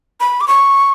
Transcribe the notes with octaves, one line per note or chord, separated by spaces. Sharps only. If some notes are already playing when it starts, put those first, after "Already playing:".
B5
D6
C#6